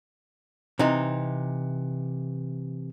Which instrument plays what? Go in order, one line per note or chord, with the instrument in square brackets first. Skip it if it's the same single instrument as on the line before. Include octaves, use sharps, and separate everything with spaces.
[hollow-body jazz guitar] C3 E3 D#4